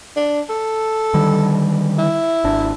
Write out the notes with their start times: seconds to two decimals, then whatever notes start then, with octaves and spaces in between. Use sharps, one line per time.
0.16 D4
0.50 A4
1.14 D3 D#3 G3
1.99 E4
2.44 G#1 D4